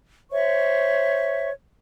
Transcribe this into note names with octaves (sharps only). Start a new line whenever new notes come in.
C5 C#5 E5 C#6